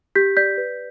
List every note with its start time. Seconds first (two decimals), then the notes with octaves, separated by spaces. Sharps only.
0.15 G4 G6 B6
0.37 D5 G6 B6
0.57 B4